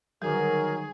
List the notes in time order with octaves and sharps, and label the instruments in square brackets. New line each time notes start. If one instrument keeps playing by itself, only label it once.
[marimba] D3 G3 [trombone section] D#3 F#3 [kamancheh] G#4 [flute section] A#4